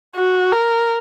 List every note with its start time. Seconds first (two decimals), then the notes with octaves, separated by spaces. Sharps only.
0.16 F#4
0.52 A#4